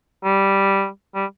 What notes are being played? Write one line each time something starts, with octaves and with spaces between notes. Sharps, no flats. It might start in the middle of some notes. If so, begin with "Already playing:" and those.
G3
G3